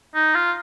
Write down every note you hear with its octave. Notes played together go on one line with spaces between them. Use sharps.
D#4
F4